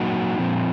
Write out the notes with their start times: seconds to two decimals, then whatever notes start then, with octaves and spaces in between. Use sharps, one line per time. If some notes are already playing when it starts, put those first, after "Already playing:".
Already playing: A#2 F#3 A#3 D#4 F#4
0.38 A#2 F3 C4